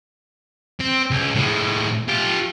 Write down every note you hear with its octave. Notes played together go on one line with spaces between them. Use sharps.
C4
C#2
A2 G#3
F4 G4